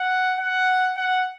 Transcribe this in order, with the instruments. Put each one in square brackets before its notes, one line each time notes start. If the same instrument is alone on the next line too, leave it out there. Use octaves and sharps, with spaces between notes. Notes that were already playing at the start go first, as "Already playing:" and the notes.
Already playing: [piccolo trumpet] F#5
F#5
F#5